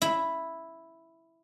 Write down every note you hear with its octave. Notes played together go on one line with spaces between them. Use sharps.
E4